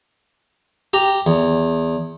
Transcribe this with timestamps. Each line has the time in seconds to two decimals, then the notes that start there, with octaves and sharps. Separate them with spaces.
0.93 G4 A#5
1.27 E2